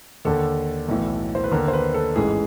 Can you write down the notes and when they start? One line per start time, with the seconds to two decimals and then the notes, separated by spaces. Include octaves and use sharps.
0.25 D#2 D3 A4
0.88 B1 A2 E3
1.35 C5
1.44 B4
1.51 D#2 D3 A#4
1.68 C5
1.73 B4
1.94 A4
2.16 A1 G#2 E3 G#4